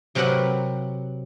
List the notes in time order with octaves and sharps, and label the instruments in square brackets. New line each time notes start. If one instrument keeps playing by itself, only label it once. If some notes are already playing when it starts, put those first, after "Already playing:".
[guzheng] C3 F#3 C4 A#4 B4 F#5